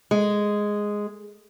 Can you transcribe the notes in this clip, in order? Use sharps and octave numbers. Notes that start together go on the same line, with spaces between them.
G#3